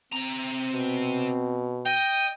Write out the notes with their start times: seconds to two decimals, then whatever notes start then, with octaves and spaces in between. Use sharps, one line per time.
0.13 C3 C4 A#5
0.73 B2
1.86 D#5 G5